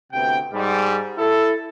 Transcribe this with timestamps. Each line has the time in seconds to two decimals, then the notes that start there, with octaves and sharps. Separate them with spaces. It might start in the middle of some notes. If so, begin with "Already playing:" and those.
0.13 D2 C3 B3 G5
0.53 G#2 G3
1.18 E4 A4